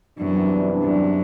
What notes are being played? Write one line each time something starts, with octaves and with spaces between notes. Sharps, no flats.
F#2 C3 E3 G3 B3 D4
F#2